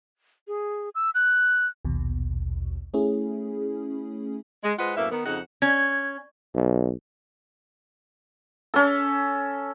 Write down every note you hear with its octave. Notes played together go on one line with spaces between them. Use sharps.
G#4
E6
F#6
A#1 D#2 B2
A3 C#4 E4 G#4
G#3
G#3 F4 B4 C5 D#5 F#5
F#2 A2 A#3 B3 E5
D#3 B3
F2 C#3 D#4 F#5
C#4 G#6
B1
C#4 A4